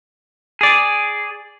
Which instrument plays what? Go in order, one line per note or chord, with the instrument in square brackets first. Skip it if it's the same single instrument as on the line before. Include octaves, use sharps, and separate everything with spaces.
[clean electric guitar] G#4 D5